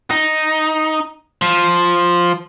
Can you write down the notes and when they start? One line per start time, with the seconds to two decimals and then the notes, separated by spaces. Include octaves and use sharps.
0.11 D#4
1.42 F3